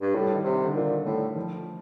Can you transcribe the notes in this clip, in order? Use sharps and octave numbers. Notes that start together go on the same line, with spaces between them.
G2
A2 G3
D#3
C3
D3
A#2 D#3
A2 A3
F3